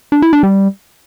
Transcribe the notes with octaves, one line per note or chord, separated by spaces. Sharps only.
D4
E4
D4
G3